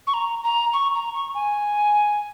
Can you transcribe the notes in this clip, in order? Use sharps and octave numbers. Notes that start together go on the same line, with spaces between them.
C#6
A#5
A#5
C#6
A#5
C#6
G#5